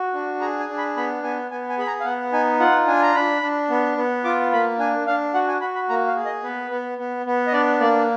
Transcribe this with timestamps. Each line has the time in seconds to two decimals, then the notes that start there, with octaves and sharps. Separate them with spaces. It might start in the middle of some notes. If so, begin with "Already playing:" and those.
Already playing: F#4
0.14 D4
0.41 G#4 A#5
0.60 G#5
0.69 D4
0.78 B5
0.97 B3 B5
1.23 B3 G#5
1.51 B3 G#5
1.69 G#5
1.78 G#4 B5
1.87 A#5
2.01 F5
2.05 B3 F#5
2.32 D#4 G#5
2.60 F4 F#5
2.87 D4 G#5
3.02 A#5
3.15 D4 B5
3.42 D4
3.70 B3
3.97 B3
4.24 F4 D6
4.52 A#3 B5
4.79 D4 G#5
5.07 D4 F5
5.34 F#4 F#5
5.48 G#5
5.61 F#4 B5
5.75 B5
5.89 A#3 A#5
6.07 F5
6.16 G#4
6.25 D#5
6.44 B3 B4
6.71 B3
6.98 B3
7.26 B3
7.47 D#5
7.53 D4 D5
7.80 A#3 D5